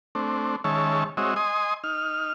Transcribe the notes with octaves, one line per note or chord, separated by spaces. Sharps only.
A3 C4 D4
D#3 G#3 C#4 C#5 E5 A5
G#3 C4 F#4 C#5 D#5 E5
D#5 G#5 C6 D#6
D#4 F6